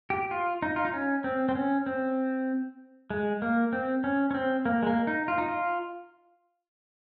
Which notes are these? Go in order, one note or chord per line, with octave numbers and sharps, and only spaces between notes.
G4
F4
D#4
F4
D#4
C#4
C4
C4
C#4
C4
G#3
A#3
C4
C#4
C#4
C4
A#3
G#3
A#3
D#4
F4
D#4
F4